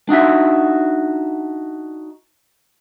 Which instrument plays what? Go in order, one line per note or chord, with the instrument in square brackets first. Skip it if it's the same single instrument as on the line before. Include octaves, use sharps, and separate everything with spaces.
[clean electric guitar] D4 D#4 F#4 E5